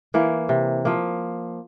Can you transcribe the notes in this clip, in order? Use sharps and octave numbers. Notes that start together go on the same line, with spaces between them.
E3 A#3
C3
F3 A#3